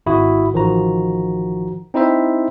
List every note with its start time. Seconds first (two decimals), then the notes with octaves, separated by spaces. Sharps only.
0.06 G#1 E4 F#4 D#6
0.53 A1 D#3 F3 F#4 A#5
1.94 C4 D#4 E4 C5 E5